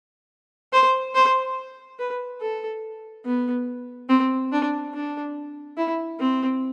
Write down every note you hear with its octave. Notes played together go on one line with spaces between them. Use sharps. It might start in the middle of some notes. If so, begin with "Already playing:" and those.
C5
C5
B4
A4
B3
C4
D4
D4
E4
C4